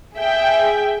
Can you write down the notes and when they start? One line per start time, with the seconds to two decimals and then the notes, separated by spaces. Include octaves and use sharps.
0.16 G#4 E5 G5